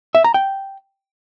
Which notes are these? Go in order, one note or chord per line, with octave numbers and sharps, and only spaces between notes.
E5
A#5
G5